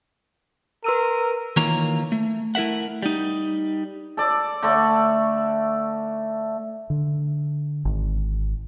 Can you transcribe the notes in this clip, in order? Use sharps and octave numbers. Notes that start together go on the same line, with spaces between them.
A#4 B4 E6 D#7
D#3 E3 A#3 F4 C#5 A#5
A3
A3 E4 A#4 E5 F#5
G3 D#4
A4 D5
D3 A3 A4 D5
D3
G#1